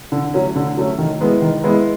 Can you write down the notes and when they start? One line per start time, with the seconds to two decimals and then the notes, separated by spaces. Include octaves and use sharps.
0.12 D3
0.34 F#3 A3 C#4
0.56 D3
0.77 F#3 A3 C#4
0.98 D#3
1.21 G#3 B3 E4
1.42 D#3
1.64 G#3 B3 E4